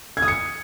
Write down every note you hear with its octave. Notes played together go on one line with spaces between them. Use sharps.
G#6
D#6
C#7